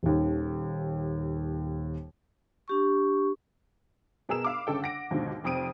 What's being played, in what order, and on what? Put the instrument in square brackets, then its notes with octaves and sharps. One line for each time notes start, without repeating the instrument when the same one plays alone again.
[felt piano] D#1 D#2
[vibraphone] D4 G4 C#6
[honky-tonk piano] B2 B3 G#4 A#4 E6 E7
F5 B5 D6
G1 C#3 A4 G5
F#5 A#6 D7
D#2 G#2 B2 D3 F3
F1 F2 C4 D#6 D7 D#7